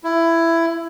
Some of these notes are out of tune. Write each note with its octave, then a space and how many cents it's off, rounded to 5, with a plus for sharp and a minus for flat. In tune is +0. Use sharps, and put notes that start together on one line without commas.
E4 +15